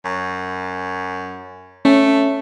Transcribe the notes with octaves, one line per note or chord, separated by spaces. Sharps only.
F#2
A3 C#4